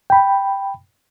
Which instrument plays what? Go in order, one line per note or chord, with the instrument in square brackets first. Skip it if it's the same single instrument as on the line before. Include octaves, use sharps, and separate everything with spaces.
[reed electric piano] G5 B5